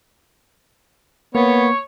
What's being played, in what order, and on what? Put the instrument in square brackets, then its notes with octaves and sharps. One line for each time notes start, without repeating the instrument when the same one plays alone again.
[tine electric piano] A#3 [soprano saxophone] B3 [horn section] C#5